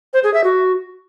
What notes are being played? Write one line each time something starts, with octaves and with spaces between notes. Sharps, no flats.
C5
G#4
E5
F#4